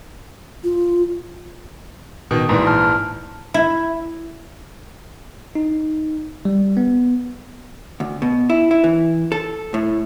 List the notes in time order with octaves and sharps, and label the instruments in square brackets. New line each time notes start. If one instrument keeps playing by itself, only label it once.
[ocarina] F4
[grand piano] B2 D#3 [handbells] D#6
[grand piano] A#1 G#2 E3
[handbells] A5 F6 G6
[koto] E4
[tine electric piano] D#4
G3
B3
[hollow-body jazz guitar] D2
B2
E4
E4
E3
A4
A2